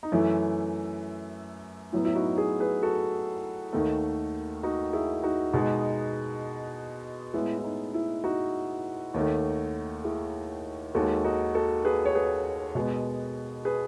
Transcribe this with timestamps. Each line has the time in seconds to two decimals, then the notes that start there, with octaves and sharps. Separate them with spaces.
0.03 D#4
0.12 F#2 E3 A3 E4
1.93 A2 F#3 B3 E4
2.05 E4
2.15 D#4 F#4
2.37 E4 G#4
2.60 G#4 B4
2.83 F#4 A4
3.73 D#2 D#3 A3
4.63 D#4 F#4
4.93 E4 G#4
5.23 D#4 F#4
5.53 B2 G#3 B3 D#4
7.34 A2 G#3 B3 E4
7.58 E4
7.64 D#4
7.94 E4
8.24 D#4 F#4
9.14 D#2 D#3 A3
10.04 E4 G#4
10.95 D#2 D#3 G#3 F#4 A4
11.25 D#4 F#4
11.55 F#4 A4
11.85 G#4 B4
12.06 C#5
12.15 G#4 B4
12.75 B2 G#3 B3
13.65 G#4 B4